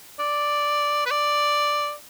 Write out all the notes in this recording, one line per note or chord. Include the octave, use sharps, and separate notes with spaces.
D5
B4
D5